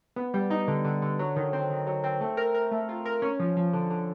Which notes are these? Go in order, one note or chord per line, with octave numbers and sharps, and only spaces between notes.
B3
G3
D#4
D3
D3
D3
F#3
D#3
C4
D#3
F#3
C4
A3
A#4
A#4
A3
F4
A#4
C#4
F3
F3
D3
D3